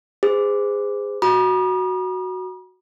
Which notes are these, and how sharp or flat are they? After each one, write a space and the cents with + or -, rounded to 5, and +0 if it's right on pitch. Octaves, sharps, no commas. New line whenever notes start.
G#4 -20 C5 -35
F#4 +0 B5 -45 D#6 -45